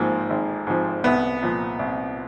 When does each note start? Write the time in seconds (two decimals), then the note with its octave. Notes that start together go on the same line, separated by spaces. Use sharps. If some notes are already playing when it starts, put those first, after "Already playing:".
Already playing: G#1 G#2 F3 A#3
0.30 G#1
0.67 G#2 F3
1.04 C2 B3
1.43 A#2 F3
1.79 C2